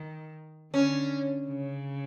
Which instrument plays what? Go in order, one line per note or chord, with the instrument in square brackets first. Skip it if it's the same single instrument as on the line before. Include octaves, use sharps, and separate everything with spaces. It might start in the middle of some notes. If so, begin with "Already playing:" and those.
Already playing: [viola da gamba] D#3
[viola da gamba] D3 [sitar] C#4
[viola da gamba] C#3